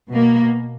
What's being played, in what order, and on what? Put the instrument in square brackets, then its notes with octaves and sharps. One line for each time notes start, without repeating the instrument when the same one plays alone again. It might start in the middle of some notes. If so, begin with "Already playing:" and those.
[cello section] B2 A#3